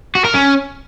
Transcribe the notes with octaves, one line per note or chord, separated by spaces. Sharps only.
F#4
A#4
C#4